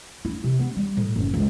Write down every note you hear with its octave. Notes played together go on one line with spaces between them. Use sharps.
E4
C3
B3
G3
A2
F#1
C#2